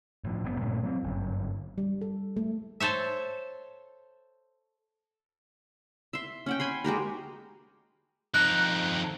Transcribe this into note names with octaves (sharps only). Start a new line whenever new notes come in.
A2 F3
F#1 C#3 B3
G2 A#2 C#3 A3
F#3 C4
G1 F#2
G3
A4
A3
A4 C5 C#5 E5
E5 C6
C#4 F#5 G5
G#5 B5 C6
G#3 F#4 G4 A#4
F2 D#4 F#6